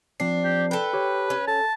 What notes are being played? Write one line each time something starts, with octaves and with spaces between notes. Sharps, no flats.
F3 C4 D4 C7
G4
A4 B4 G5
G4 C#5
C#4
A4 A5